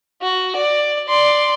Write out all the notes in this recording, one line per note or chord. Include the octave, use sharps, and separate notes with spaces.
F#4
D5
D5 C6